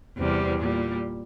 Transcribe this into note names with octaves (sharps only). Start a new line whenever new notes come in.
E2 C3 G3
A#2 G3